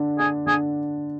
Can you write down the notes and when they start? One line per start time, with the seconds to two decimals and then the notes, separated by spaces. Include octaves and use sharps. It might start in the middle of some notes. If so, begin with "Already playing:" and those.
Already playing: D3 D4
0.19 D4 G#4
0.47 D3 G#4